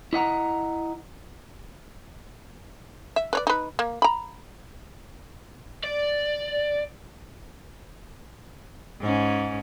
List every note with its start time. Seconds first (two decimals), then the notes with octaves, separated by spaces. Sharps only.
0.13 E4 D#5 F#5 A#5
3.16 E5
3.33 B4 C#5 D5
3.47 D#4 B4
3.79 A#3
4.02 A#5 B5
5.84 D5
9.01 G#2 C#4